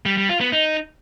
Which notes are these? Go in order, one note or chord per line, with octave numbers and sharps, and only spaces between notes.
G3
G3
F4
B3
D#4